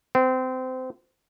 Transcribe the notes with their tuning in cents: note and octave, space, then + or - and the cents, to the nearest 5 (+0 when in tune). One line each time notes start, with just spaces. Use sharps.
C4 -25